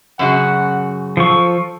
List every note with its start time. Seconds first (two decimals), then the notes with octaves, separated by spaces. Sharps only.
0.19 F#2 C#3 F#4 F#5
1.17 F3 A4 C#6